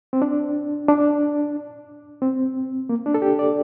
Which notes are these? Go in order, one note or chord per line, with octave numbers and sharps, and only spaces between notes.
C4
D4
D4
C4
A#3
D4
A4
G4
D5